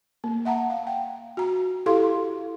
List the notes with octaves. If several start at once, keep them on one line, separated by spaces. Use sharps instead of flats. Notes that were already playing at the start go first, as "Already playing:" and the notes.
A#3
E5 F#5 A5 A#5
F5
G5
F#4 A#5
E4 G4 A4 F5 C6